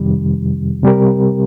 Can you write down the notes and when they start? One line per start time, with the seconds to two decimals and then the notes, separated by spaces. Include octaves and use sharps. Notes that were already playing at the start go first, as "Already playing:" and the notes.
Already playing: F2 C3 D#3 G3
0.83 C3 G3 C4 G4 A#4